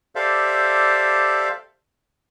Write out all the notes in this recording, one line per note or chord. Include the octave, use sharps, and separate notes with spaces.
G4 A4 C5 D5 E5 F5